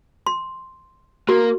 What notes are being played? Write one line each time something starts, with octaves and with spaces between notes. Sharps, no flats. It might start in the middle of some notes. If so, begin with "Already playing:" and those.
C6
A#3 F#4